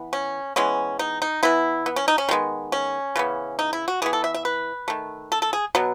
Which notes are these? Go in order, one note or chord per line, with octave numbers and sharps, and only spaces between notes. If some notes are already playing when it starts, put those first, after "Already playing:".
Already playing: E3 B3
C#4
E3 G#3 B3 C#4
D#4
D#4
E3 B3 E4
B3
C#4
D#4
C#4
D#3 G#3 B3
C#4
C#3 E3 B3
D#4
E4
F#4
E3 B3 G#4
A4
E5
E5
B4
D#3 A3
A4
A4
G#4
B2 F#3 B3